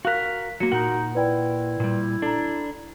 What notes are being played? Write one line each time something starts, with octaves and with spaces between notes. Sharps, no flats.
F#4 A#4 F5 F#6 B6
F#3 A#3 F#4 C#7
A#2 D#4 A#4 F#5
E4 B4 D5 G5
A#2 G3
D4 A4 A#5